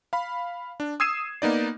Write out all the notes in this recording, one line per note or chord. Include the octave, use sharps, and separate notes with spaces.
F5 B5
D4
D#6 E6 G#6 C7 D#7 E7
A#3 B3 D#4 D5